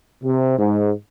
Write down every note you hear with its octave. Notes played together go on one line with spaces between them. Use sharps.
C3
G#2